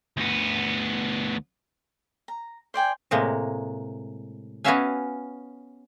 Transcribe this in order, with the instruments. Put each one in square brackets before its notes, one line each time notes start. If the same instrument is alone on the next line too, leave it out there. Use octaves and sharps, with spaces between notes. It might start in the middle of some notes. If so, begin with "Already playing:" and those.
[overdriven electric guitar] D2 B3
[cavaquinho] A#5
C5 D5 G5 G#5
[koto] A2 C3 G#3 A#3
B3 C#4 F#4 E5 F5 G#5